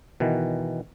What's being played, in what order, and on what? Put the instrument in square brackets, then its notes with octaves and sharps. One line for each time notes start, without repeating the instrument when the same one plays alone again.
[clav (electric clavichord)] B2 D#3 E3